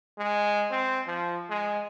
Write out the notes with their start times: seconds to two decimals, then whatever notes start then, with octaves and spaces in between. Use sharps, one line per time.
0.18 G#3
0.71 C4
1.07 F3
1.50 G#3